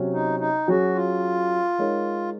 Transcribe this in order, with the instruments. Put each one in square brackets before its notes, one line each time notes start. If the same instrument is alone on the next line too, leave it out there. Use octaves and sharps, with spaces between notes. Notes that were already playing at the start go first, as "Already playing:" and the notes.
Already playing: [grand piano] C3 F#3 C#4 F#4
[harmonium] D#4
D#4
[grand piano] F#3 C#4 G#4 [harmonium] F#4
[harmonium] F4
[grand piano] G#3 D#4 A#4 C#5